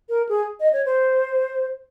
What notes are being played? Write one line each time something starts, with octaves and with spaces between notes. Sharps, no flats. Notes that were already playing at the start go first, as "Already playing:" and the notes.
A#4
G#4
D#5
C#5
C5